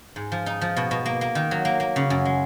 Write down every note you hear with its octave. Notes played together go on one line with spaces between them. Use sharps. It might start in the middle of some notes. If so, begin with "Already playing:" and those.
G#2
F3
D#4
F3
B2
B2
A#3
A#3
D#3
F#3
A#3
A#3
C#3
F#2
G#3